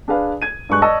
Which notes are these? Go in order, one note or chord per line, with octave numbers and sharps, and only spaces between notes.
D4 G#4 B4 F5
G#6 D#7
G2 G#3 C#6 F#6
D5 D#5 A5 C#6 E6